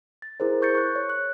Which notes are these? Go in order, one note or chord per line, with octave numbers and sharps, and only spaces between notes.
A6
E4 G#4 A#4 C5
C#6 G6 A6 C#7
C#6 F#6
C#5
F#6